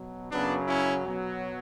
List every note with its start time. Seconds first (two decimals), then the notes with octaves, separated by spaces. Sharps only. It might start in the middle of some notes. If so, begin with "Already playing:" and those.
Already playing: B2 F#3
0.31 F#2 C#3 F#3 B3 D4
0.68 C#4 E4
1.06 B2 F#3